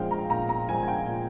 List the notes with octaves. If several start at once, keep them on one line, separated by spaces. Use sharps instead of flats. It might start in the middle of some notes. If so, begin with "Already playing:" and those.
Already playing: A#2 F3 G#3 F5 G5
A#5
A#2 A#5
A#5
F3 G#3 G#5
G#5
G5
A#2